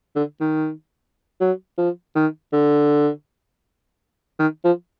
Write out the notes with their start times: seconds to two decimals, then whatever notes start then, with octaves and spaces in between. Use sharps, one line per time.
0.16 D3
0.41 D#3
1.41 F#3
1.78 F3
2.15 D#3
2.53 D3
4.39 D#3
4.64 F3